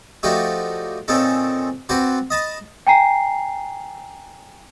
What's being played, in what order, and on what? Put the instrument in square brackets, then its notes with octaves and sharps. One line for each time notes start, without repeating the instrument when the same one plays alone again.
[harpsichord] F3 A3 D4 D#4 F#4 G4
A#2 C4 C#4 D#4 A4
C4 F#4 B4 C5 D5
D#5 A5 B5
[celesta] G5 G#5 A#5 C7